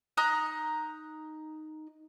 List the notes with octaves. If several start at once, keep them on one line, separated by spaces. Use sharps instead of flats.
D#4 A#5 F#6